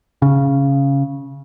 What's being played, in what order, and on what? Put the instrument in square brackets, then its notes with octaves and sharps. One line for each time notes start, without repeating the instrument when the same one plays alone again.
[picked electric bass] C#3